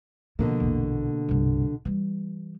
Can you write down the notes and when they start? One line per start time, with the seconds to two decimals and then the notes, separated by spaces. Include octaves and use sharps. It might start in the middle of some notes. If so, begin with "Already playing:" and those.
0.39 B2 D3 D#3 F3 A#3
0.60 A#1 E2
1.29 C2 G2
1.85 E3 G3